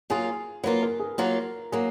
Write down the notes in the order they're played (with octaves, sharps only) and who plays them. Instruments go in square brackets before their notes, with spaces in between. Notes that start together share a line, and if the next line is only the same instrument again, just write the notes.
[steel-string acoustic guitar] F#3 A#3 F4 [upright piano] G#4
[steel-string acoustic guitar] F#3 A#3 F4 [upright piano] B4
[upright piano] A#4
G#4
[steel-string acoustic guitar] F#3 A#3 F4 [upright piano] A#4
[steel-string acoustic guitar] F#3 A#3 [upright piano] G#4